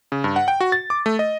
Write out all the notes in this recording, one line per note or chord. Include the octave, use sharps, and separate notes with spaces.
C#3
G2
F#5
G5
F#4
A6
D6
A3
D#5